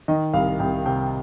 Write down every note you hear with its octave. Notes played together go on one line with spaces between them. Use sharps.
D#3 D#5
C2 F5
C2 G5
C3 G5